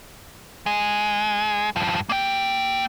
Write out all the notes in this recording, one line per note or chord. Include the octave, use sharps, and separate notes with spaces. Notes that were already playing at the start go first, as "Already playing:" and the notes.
G#3
G2 F3
A#3 G5